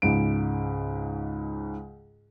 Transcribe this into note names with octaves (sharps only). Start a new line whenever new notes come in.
C#2 G#2 D7